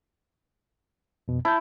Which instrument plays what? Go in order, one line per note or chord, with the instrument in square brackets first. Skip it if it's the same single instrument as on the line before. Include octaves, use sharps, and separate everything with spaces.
[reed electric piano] F2 B2
[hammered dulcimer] E4 [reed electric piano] A5 G6